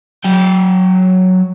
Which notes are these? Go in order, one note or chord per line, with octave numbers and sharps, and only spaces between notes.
F#3 G5